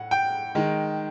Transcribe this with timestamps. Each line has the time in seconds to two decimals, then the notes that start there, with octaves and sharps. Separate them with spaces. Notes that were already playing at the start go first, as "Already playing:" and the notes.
Already playing: A2 F#5
0.11 G5
0.55 D#3 G#3